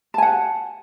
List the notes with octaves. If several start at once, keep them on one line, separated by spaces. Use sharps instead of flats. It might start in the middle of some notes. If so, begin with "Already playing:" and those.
F#5 G#5 A5